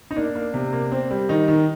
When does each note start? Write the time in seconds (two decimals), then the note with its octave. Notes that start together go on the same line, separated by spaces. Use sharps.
0.11 D#4
0.16 A#3 D4
0.35 A#3
0.54 C3
0.73 A#3
0.92 C4
1.11 G3
1.29 D#3 D#4
1.48 D#3